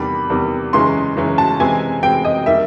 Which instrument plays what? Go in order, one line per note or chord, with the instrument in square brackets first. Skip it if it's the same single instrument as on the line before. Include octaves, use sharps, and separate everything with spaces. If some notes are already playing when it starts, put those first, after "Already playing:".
Already playing: [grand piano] E2 C3 D#3 G3 [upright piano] B5
[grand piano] E2 C3 D#3 G3
[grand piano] F#2 C#3 E3 G#3 C#4 [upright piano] C6
[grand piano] F#2 C#3 E3 G#3 C#4
[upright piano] A5
[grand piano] C3 E3 G#3 C4 [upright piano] G#5
[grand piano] C3 E3 G#3 C4 [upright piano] G5
[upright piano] D#5
[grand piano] D#3 G3 A#3 [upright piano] E5